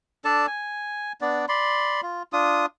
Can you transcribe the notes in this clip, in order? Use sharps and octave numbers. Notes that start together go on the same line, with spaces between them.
D4 A4 D5 A5
G#5
B3 D4 D5
D5 B5 C6
F4
D4 F4 D#6